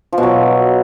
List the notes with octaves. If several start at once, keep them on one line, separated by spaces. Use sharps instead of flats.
F3
B2
F#3